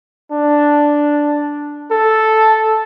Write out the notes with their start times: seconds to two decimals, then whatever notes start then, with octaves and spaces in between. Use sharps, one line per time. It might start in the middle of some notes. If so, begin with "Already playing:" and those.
0.32 D4
1.91 A4